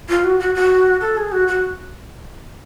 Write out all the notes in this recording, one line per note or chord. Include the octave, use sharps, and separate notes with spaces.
F4
F#4
F#4
F#4
A4
G#4
F#4
F#4